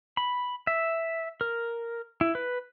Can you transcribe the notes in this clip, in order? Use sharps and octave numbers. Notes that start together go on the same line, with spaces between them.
B5
E5
A#4
E4
B4